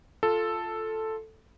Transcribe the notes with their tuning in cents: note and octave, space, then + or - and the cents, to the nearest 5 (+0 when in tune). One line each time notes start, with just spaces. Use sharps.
F4 +0 A4 +0